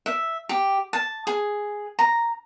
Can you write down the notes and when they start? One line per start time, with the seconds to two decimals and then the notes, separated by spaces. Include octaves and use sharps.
0.06 E5
0.49 G4
0.93 A5
1.27 G#4
1.99 A#5